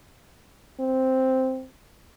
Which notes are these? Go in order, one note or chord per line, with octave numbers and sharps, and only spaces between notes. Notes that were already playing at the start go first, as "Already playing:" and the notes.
C4